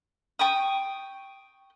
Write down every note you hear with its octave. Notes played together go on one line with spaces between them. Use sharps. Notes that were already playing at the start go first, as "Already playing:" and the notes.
G5 C#6 D#6